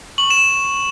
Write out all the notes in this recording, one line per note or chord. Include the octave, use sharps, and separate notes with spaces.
C#6 F#7
E7